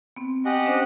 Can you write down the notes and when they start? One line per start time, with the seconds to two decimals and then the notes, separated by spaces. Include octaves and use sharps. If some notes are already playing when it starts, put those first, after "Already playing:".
0.16 B3 C4
0.45 G4 D#5 F#5 G#5
0.66 C#4 D4 C5